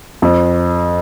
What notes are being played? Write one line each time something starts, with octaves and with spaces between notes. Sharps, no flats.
F2